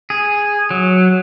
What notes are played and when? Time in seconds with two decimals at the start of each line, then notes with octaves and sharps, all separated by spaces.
0.10 G#4
0.71 F#3